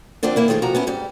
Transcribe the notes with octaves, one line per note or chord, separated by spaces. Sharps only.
D3 F3 A#3 C4 D4
E3 A#3 E4
D#3 F3 A3 F4 G#4
C3 F3 F#4 A#5
B3 C#4 E4
G#2 G3